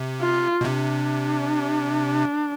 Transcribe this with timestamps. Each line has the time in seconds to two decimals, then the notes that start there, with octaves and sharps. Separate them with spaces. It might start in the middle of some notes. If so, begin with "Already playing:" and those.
Already playing: C3
0.20 F4
0.61 B2
0.64 C3 D4